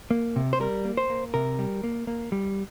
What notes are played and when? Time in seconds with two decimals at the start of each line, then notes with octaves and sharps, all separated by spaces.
0.11 A#3
0.36 C3
0.53 C5
0.60 G3 A#4
0.85 A#3
0.97 C5
1.10 A#3
1.34 C3 A#4
1.59 G3
1.84 A#3
2.07 A#3
2.32 G3